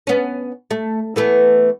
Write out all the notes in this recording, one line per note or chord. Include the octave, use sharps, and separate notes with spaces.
B3 C#4
A3
E3 A3 B3